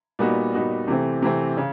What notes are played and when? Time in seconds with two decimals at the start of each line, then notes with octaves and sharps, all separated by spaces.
0.19 A#2 G3 B3 D#4 F#4
0.53 A#2 G3 B3 D#4 F#4
0.88 C3 E3 A3 C4
1.22 C3 E3 A3 C4
1.57 C#3